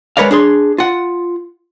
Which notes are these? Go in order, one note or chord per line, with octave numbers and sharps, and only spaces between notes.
G#3 A#4 B4 C#5 D5 F5
D4 G#4 C6
F4 F#5